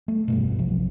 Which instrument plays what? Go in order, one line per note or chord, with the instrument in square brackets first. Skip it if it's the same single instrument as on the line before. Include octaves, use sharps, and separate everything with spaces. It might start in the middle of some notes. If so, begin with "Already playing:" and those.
[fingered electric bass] A3
E1 G2 B2
A#1 C3 F3 F#3